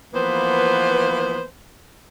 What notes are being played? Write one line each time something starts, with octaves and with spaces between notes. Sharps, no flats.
E3 F3 A#3 B3 B4 C5